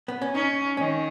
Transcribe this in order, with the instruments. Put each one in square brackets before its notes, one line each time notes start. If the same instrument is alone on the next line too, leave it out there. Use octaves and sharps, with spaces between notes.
[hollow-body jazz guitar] B3
C#4
[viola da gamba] C#4 [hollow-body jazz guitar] D#4
[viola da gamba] D#3 [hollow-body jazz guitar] C#4